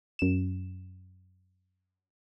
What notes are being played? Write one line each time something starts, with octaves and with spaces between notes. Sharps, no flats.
F#2 E7